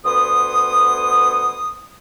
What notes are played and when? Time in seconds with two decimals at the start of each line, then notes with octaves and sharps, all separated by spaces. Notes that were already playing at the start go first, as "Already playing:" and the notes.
0.05 D2 B3 F#5 C6 D#6